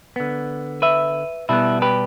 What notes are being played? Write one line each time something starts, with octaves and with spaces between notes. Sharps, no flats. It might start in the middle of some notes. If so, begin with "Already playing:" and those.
D3 B3
B4 E5
B2 G3 B3 E4
G4 B4